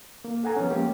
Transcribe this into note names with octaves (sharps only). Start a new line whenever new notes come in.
A#3
A4 F#5 G#5 A#5
F3 B3 C#4
G#3 A#3 G4